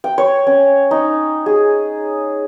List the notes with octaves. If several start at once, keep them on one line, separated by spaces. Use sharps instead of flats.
G5
C#5
C#4
D#4
G#4